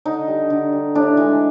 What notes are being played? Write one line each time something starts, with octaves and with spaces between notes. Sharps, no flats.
D3 D#4
G3
D3
G3
A2 D4
E3 G#3